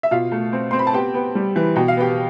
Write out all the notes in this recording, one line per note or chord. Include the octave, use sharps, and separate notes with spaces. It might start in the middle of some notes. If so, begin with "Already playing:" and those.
E5
B2 F4 F5
A3
C4
C4 C6
B5
A5
B3 G4 G5
B3
G3
E3
B2 G5
F5
B3 G4 G5